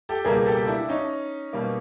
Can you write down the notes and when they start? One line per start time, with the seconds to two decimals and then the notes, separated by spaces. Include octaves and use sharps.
0.09 G4 A4
0.25 C#2 B2 G3 A#3 G#4 A#4
0.46 G4 A4
0.67 D4 E4
0.89 C#4 D#4
1.53 B2 G3 A#3